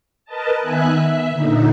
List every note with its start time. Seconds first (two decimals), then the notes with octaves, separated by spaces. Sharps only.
0.25 A#4 B4 D#5 A5
0.59 D#3 B3 E5 G#5 F#6
0.91 E5
1.30 A#2 D3 D#4